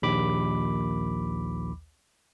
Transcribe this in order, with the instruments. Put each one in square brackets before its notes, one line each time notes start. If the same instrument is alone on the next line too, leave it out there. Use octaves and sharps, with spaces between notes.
[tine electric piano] A#1 D#2 B5 D6